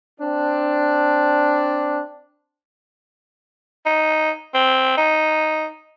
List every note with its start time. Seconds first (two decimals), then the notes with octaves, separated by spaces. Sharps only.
0.19 C4 D4
3.86 D#4
4.54 C4
4.97 D#4